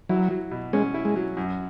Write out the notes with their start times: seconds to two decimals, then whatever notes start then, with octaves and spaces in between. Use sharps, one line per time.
0.09 F#3 E4
0.31 F#3
0.51 B2
0.73 G#3 C#4
0.94 E4
1.05 G#3
1.16 F#3
1.37 F#2